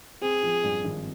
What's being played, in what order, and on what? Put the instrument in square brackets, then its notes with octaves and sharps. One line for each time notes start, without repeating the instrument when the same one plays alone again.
[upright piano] C4 [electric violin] G#4
[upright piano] F3
G2
G#1